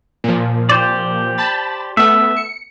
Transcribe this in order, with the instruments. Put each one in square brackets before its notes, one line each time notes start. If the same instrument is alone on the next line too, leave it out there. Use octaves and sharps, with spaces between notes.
[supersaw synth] A#2 F3
[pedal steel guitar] G4 C5 D5
[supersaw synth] A5 B5 A6
[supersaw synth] A3 B3 [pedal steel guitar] E5
[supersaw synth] C#7